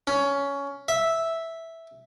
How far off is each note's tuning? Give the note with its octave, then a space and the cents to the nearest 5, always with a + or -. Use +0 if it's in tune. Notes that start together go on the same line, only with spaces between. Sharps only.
C#4 +15
E5 -5